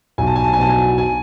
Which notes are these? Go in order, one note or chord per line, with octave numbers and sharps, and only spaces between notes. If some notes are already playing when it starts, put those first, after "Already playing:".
B1 G#5
A5
G#5
A5
G#5
B2 F#3 B3 A5
G#5
G#5